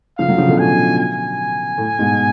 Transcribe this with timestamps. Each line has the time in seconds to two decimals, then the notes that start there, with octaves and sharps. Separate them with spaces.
0.18 C#3 F3 F5
0.28 D3 F#3
0.38 C#3 F3
0.49 B2 D3
0.58 A2 C#3 G#5
0.98 G#5
1.78 A2
1.99 G#2 B2